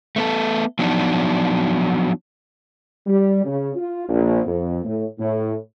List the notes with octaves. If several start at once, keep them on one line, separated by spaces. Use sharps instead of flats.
A3 B3 A4
F3 F#3 B3 D4 D#4
G3
C#3
F4
A#1
F2
A2
A2